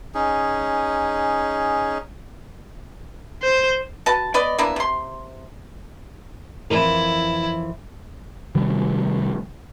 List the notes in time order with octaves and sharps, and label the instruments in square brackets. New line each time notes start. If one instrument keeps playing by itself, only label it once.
[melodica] C#4 D#4 G#4
[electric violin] C5
[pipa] F#4 B4 A5
B3 B4 D5 D#5
A#3 B3 D4 E4
C3 C6
[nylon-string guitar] F2 E3 A#4 [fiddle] E4
[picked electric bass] C3 D#3 F#3 G3